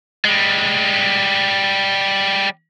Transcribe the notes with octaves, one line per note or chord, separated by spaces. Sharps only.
G3 G#3